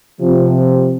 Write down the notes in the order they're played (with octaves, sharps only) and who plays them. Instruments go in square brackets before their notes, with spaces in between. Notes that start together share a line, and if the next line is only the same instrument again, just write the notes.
[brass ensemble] C3 F3